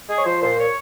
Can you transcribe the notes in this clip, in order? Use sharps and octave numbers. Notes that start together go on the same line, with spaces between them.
G#3 G#4
C#5
F3 C5
A#2 C5
C#5